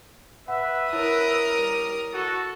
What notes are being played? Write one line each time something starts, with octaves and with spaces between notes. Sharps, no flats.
B4 E5 F#5
E4 A#4 C#5 D#6
G3
F#4 A4